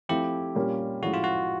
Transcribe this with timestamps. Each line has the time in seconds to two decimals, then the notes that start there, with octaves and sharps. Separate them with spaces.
0.09 F3 A3 C4 E4 G4
0.55 A#2 G3 A#3 C#4 F4
1.02 A2 F3 G#3 C#4 E4 F#4
1.14 F4
1.24 F#4